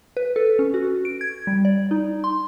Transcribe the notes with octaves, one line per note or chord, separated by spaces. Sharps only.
B4
A4
C#4
F#4
D7
G#6
G3
D5
D#4
C6